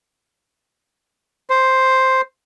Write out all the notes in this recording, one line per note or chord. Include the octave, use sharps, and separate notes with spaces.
C5